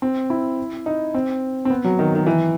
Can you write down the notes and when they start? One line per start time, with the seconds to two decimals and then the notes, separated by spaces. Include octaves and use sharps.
0.02 C4
0.30 E4
0.86 D#4
1.14 C4
1.65 C4
1.70 B3
1.84 F#3
1.99 D#3
2.15 D#3
2.27 E3